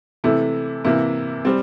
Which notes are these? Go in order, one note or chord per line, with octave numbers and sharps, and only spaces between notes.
C3 E3 A3 E4
C3 E3 A#3 E4
G3 C4